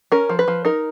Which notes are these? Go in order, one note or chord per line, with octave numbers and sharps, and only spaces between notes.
C#4 A#4
F3
B4
F3
D#4 A#4